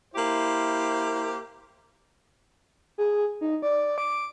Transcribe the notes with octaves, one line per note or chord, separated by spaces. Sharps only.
A#3 E4 G4 C5
G#4
D#4
D5
D6